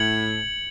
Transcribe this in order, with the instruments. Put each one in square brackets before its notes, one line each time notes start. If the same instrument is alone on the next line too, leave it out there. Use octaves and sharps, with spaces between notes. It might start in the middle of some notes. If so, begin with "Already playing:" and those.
Already playing: [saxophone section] A2 [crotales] G#6 C#7 F#7